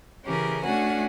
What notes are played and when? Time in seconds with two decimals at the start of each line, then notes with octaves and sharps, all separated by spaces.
0.25 C#3 E3 C#4 G4 G#4 A#4
0.64 A3 C#4 D4 F#4 F#5 G#5